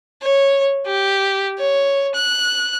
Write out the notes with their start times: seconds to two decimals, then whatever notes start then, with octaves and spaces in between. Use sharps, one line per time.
0.22 C#5
0.86 G4
1.58 C#5
2.15 F#6